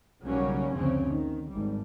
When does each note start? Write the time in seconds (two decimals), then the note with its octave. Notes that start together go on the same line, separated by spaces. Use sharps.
0.24 B1 C#3 F#3 G3 A#3 C#4
0.73 F#1 D2 C#3 F3 C4 C#4
1.09 D#3
1.50 G#1 G3